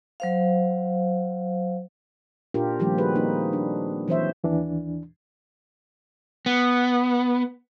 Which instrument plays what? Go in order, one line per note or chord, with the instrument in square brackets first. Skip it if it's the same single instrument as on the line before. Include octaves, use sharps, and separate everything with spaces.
[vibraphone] F#3 C5 F5
[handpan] A#2 D4 F4 G4 A#4
D#3 F3 G3 A3 A#3 G4
F#4 G#4 B4
A#3 C4 D#4 G4
D4
E3 F#3 C4 C5 C#5 E5
[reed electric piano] D#2 E3 D4
[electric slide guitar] B3